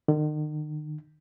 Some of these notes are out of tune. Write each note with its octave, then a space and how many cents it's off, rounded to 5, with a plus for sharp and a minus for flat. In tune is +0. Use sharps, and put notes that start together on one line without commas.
D#3 -40